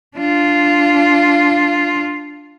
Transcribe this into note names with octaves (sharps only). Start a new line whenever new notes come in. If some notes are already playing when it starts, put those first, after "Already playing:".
D4 F4